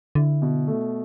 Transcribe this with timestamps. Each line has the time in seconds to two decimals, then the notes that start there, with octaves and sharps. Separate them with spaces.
0.15 D3 E4
0.42 B2
0.68 A3